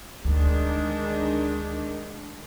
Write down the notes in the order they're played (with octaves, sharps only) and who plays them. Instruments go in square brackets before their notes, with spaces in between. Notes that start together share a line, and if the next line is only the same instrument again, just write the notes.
[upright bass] D2 [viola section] D#3 G#3 D4